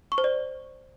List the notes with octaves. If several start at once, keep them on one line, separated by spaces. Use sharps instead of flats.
C#6
C5
D5